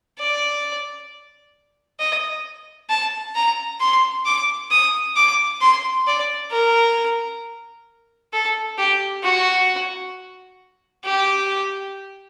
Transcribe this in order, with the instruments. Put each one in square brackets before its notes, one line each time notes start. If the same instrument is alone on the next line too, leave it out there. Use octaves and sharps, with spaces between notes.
[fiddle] D5
D#5
A5
A#5
C6
D6
D#6
D6
C6
D5
A#4
A4
G4
F#4
G4